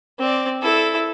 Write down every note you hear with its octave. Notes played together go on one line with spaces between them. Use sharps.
C4 D5
E4 A4